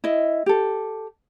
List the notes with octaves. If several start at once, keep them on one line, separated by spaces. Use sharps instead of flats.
E4 D#5
G4 A4